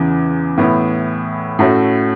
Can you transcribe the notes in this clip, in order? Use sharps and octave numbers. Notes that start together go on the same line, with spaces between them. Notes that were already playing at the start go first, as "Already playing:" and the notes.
Already playing: E2 C#3 E3
A2 E3 B3 E4
A2 A3 C#4 F#4